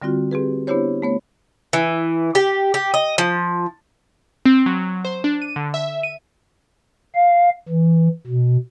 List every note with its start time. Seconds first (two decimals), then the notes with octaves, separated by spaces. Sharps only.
0.02 D3 G3 C4 F4 F#4
0.31 C4 G4 G#4 B4
0.67 B3 D4 E4 G4 C5 C#5
1.02 A3 B3 C#5
1.73 E3
2.35 G4
2.74 G4
2.94 D#5
3.18 F3
4.46 C4
4.66 F#3
5.05 C5
5.24 D4
5.42 D#7
5.56 D3
5.74 E5
6.03 D#7
7.15 F5
7.69 E3
8.27 B2